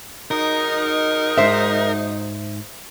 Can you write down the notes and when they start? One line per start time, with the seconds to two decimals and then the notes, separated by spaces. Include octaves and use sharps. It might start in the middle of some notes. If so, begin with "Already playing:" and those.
0.31 F#3 G#3 D#4 A#4
1.37 G#2 C5 E5